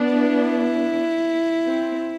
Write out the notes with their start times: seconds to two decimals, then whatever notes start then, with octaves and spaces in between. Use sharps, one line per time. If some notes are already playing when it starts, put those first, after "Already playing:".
Already playing: B3 D4
0.13 E4
1.68 C4